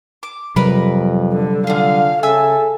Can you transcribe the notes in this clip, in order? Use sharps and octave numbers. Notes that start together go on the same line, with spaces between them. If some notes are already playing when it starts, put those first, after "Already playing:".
D6
F2 C3 F#3 G3 A#4 B4 B5
D3
D3 F4 G#4 F5
C#3 A4 E5 G#5 E6